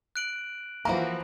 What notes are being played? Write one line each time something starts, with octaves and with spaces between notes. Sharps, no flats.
F#6 D7 F#7
E3 F3 A#3 E4 F#4 A#5